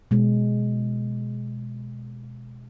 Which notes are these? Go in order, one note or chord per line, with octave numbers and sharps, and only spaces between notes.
B2 G#3